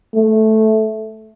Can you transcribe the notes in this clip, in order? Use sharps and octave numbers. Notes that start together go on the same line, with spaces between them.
A3